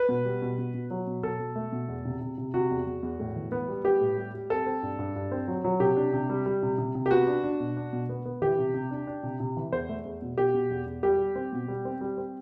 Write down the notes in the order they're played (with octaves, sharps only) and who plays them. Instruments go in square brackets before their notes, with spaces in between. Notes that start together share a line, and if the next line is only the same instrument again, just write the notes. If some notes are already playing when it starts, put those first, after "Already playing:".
Already playing: [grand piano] B4
B2
G3
B2
B2
B2
F#3
B2
B2 A4
B2
A3
B2
E2
C3
C3
C3
C3 F#4
E2
E2
E2
A2
E3
B3
G3
B3 G4
A2
G3
G3
C4 A4
C4
G2
G2
G2
C4
F#3
F#3
C3 G4
D4
C3
G3
G3
C3
C3
C3
G4
B3 F#4
D4
D4
B2
D4
B2
B3
B3
E3 G4
C3
C3
D4
D4
C3
C3
E3
E2 C5
A3
E2
B2
B2 G4
B2
E2
E2
G3 G4
G3
C4
B2
G3
C4
G3
C4